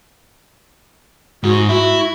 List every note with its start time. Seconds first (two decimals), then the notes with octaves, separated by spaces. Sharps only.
1.44 G#2 F#4
1.69 E4 F#4